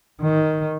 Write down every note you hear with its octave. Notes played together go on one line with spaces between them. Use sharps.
D#3